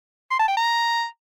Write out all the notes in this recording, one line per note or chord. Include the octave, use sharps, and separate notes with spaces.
C6
A5
G5
A#5